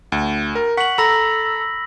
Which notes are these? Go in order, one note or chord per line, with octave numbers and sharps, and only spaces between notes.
D2
A#4
F#5 C#6 B6 F#7
A4 A#5 B5 E6 A#6